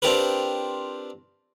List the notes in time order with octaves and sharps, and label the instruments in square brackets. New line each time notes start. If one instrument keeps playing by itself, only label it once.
[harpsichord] C4 D4 F4 G4 A#4 B4